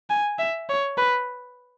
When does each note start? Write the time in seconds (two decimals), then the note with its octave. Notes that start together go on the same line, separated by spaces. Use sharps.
0.10 G#5
0.39 E5
0.69 C#5
0.98 B4